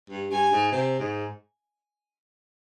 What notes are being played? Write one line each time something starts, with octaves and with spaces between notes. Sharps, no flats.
G2
G2 G#5
G#2
C3
G#2